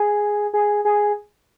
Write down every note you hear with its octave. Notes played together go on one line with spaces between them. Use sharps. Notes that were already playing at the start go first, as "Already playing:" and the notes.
Already playing: G#4
G#4
G#4